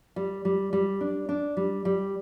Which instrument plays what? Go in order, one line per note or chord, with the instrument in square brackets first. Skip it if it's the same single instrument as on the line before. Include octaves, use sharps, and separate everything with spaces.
[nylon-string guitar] G3
G3
G3
D4
D4
G3
G3